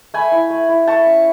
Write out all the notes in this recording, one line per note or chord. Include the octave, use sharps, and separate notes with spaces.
A3 G#5 B5
E4
A3
E4
A3 A5 C#6
C#4